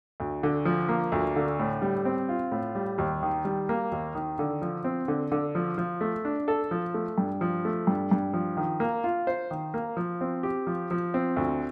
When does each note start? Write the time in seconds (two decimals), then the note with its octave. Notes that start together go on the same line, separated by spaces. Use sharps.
0.20 D2
0.43 D3
0.65 F3
0.89 A#3
1.12 D2
1.36 D3
1.59 A2
1.82 G3
2.05 C4
2.29 F4
2.52 A2
2.75 G3
2.98 D#2
3.23 D#3
3.45 G3
3.69 A#3
3.92 D#2
4.15 D#3
4.39 D3
4.62 F3
4.84 C4
5.08 D3
5.32 D3
5.55 F3
5.78 F3
6.01 A3
6.25 D4
6.48 A4
6.71 F3
6.94 A3
7.18 G2
7.41 F3
7.65 A3
7.87 G2
8.11 G2
8.34 F3
8.57 D#3
8.80 A#3
9.04 F4
9.27 C5
9.51 D#3
9.74 A#3
9.97 F3
10.21 C4
10.43 G4
10.67 F3
10.91 F3
11.14 C4
11.37 D2